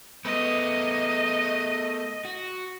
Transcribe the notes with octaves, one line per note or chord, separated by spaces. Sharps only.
A3 B3 D#5
F#4